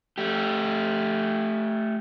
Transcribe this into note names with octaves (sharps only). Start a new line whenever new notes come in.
A3 G4